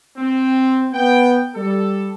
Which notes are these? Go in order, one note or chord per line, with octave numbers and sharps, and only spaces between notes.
C4
B3 G5
G3 A4